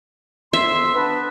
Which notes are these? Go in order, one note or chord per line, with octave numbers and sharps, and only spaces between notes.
F2 B3 E5 C6
B3 D4 B4